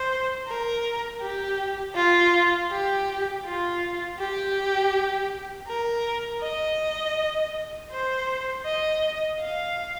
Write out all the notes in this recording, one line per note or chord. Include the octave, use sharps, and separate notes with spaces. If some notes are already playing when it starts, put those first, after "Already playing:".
Already playing: C5
A#4
G4
F4
G4
F4
G4
A#4
D#5
C5
D#5
F5